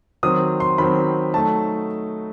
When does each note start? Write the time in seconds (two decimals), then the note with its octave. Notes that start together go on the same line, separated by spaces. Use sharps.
0.23 D#3 F#3 C4 D#6
0.60 C6
0.78 D#3 F#3 C4 B5
1.34 F#3 A3 D#4 A5